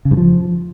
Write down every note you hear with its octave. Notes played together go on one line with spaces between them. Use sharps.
C#3
G2
F3